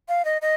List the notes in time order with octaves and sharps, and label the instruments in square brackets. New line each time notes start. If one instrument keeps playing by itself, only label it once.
[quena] F5
D#5
D#5